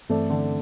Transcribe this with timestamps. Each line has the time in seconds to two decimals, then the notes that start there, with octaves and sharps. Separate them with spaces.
0.09 G2 E3 A3 C4 A4 D5
0.30 D3